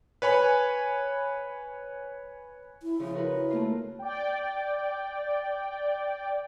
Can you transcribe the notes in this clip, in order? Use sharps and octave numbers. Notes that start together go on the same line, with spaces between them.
B4 C#5 G#5 B5
E4
C#3 F3
F#4 A#4 B4
E4
A3 A#3 F4
D5 G5